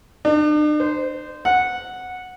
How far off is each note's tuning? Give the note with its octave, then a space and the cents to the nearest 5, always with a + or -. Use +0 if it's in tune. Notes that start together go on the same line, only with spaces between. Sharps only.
D4 +45
C5 -15
F#5 -10